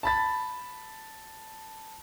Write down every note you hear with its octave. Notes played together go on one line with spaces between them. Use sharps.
A5 B5 A6